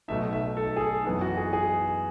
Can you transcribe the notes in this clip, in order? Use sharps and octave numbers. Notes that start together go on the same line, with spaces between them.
B1 B2 A3 D#4 E5
E5
A4
G#4
A4
F#2 E3 B3 D#4 G#4
F#4
G#4
G#4